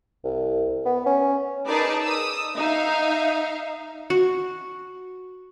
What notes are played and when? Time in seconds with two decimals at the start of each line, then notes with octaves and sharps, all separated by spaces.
0.24 C2
0.85 B3
1.06 C#4
1.68 D#4 G#4 A#4 B4 D5 A5
2.03 D#6 E6
2.57 D#4 E5 F5
4.10 F#4